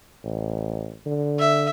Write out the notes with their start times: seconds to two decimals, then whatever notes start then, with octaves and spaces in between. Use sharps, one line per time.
0.24 A1
1.06 D3
1.39 E5